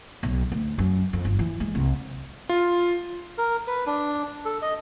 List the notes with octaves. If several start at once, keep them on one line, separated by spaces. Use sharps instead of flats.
B1
D2
F#2
F2
G1
E3
G#3
C2
F4
A#4
B4
D4
A4
D#5